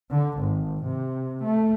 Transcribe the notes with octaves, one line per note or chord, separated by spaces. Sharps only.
D3
G#1
C3
A3